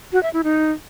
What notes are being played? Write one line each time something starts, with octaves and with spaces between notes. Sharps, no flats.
F#4
E5
E4
D#4